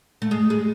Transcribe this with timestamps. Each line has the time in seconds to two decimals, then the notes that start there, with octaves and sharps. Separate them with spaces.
0.22 A3
0.31 G#3
0.50 G#3